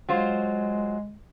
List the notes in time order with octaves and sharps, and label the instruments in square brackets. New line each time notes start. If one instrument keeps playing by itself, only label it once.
[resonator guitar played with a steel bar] F#3 F4 C5 [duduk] G#3